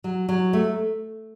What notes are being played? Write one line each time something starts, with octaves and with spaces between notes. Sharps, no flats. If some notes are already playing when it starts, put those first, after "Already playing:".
F#3
F#3
A3